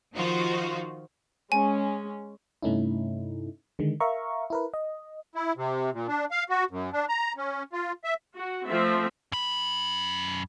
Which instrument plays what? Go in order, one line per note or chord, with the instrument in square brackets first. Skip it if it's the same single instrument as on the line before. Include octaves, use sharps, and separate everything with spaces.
[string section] D#3 F3 D#4 F4 F#4
[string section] G#3 C#4 [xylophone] G#5
[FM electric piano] G2 C3 A3 C#4 D#4 E4
D3 D#3 G#3
A#4 E5 F5 A#5 C#6
E4 A#4 B4
D#5
[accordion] E4
C3
A#2
D4
F5
F#4
F#2
D4
A#5
C#4
F4
E5
[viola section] F#4
F3 A3 C4 E5
[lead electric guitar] F#2 B5